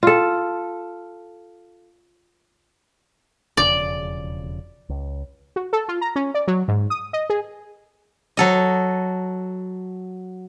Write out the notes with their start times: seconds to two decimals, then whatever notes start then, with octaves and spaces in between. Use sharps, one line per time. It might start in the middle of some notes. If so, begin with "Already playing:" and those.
0.03 F4 A4
3.57 E1 F2 C#3 D5
4.89 C#2
5.56 F#4
5.73 A4
5.88 F4
6.01 A#5
6.16 C#4
6.34 D5
6.47 F#3
6.68 G#2
6.90 D#6
7.13 D#5
7.30 G#4
8.37 F#3 A4 D#5